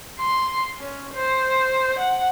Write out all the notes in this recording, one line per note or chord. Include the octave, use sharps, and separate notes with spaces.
C6
C#4
C5
F#5